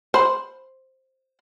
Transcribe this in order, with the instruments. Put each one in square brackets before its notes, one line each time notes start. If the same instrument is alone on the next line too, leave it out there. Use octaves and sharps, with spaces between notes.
[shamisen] C5 B5